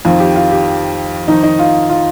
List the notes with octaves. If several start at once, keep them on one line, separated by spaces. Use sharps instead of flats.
F2 D#3 F4
G4
F4
G4
F2 D#3 D#4
D#4
F4
F4